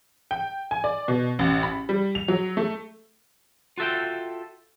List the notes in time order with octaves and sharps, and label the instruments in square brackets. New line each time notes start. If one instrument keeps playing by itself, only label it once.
[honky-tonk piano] G5
G#5
D5
B2
A1
B5
G3
F7
F#3
A3
[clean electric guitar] F4 F#4 A4 E5 G5